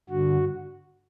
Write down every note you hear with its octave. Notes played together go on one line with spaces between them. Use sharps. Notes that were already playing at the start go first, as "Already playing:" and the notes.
G2 D3 F#4